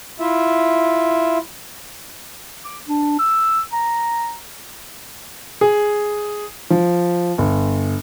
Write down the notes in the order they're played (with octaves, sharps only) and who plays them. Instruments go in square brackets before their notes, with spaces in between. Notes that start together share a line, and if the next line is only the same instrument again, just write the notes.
[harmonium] E4 F4 E5
[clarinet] D6
D4
E6
A#5
[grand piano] G#4
F3
G1